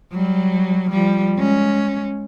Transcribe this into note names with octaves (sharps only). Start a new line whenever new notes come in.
F#3 G3
F3 G3
G#3 C#4